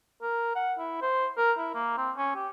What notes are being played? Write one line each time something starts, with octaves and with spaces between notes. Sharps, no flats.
A#4
F#5
E4
C5
A#4
E4
A#3
C4
C#4
G4